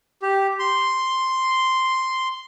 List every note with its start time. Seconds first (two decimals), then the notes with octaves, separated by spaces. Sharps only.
0.22 G4
0.59 C6